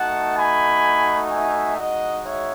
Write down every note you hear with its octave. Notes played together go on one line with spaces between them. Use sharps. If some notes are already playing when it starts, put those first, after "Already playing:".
Already playing: A3 D#4 F#4 F#5 A5
G#5 B5
E5 G#5
G#3 D#4 F#4 D#5 F#5
C#5 E5